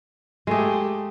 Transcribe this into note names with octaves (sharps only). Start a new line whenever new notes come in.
G#3 A3 G4 G#4